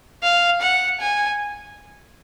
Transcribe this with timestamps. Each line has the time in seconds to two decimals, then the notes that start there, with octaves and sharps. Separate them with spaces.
0.23 F5
0.61 F#5
1.00 G#5